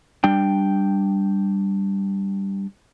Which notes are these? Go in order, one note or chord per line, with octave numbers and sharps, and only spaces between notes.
G3 D4 G5